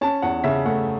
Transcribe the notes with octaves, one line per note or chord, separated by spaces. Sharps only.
C#4 A5
E2 F#5
C#3 E5
A3 F#5